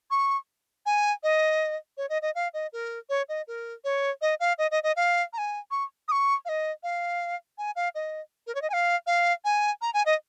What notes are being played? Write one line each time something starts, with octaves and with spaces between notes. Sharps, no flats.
C#6
G#5
D#5
C#5
D#5
D#5
F5
D#5
A#4
C#5
D#5
A#4
C#5
D#5
F5
D#5
D#5
D#5
F5
A#5
G#5
C#6
D#6
C#6
F5
D#5
F5
G#5
F5
D#5
A#4
C#5
D#5
G#5
F5
F5
G#5
A#5
G#5
D#5